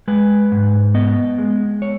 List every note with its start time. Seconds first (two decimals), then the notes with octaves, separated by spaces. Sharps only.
0.08 G#3 B4
0.52 G#2
0.94 B3 D#5
1.38 G#3
1.82 C#5